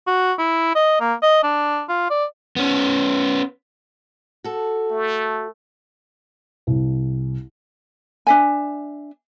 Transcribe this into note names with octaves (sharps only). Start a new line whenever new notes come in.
F#4
E4
D#5
A#3
D#5
D4
F4
D5
B3 C#4
F#4 A4
A3
C2
D4 E5 G#5